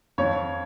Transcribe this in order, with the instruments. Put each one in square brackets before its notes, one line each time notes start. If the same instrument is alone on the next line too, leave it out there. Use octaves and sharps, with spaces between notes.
[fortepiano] F2 [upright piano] C#5